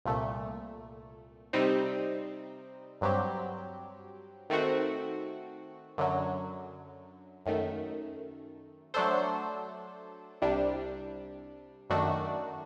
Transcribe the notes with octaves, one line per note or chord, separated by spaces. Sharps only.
C2 A#2 A3
C3 G3 C4 D#4
G2 F#3 C4 G4
D#3 A3 C4 F#4
F#2 D3 F#3
F#2 D#3 A3
F#3 A3 D4 A4 C5
C2 C3 G3 D4
F#2 D#3 A3 D4 F#4